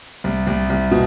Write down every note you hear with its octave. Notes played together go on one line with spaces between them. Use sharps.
C2
C2
C2
B2